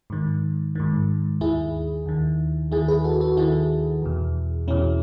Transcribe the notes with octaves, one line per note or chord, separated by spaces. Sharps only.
G#2 D#3
G#2 D#3
D#2 D#3 E4 G#4
D#2 D#3
D#2 D#3 E4 G#4
G#4 B4
F#4 A4
F#4 A4
D#2 D#3 E4 G#4
E2 B2
E2 B2 C#4 E4